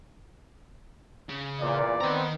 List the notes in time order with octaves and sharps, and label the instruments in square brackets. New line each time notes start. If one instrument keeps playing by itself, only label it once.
[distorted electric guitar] C#3
[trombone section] E2 A#2 [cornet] D5
[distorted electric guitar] D#3 A#5 [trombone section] B3 C4